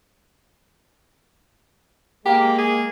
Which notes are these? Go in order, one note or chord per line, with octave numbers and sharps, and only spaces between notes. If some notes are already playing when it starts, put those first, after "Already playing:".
G#3 A#3 G4
G#4